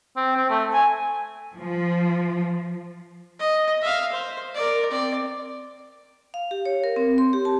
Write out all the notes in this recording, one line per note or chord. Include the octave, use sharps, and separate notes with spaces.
C4
C4
A3
G#5
F3
D#5
E5 F5
C5
A#4 D5
C4 D5
F5
G4
C#5
A#4
C4
C6
G4
A5